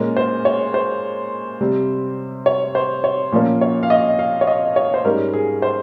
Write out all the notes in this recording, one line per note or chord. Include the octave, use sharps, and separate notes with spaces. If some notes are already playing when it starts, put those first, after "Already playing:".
Already playing: A#2 G#3 C#4 A#4
C5
C#5
C5
C3 G3 C4
C#5
C5
C#5
A#2 F3 A#3 C#4
C#5
F5
D#5
F5
C#5
D#5
C#5
C5
G#2 G3 C#4 A#4
G#4
C5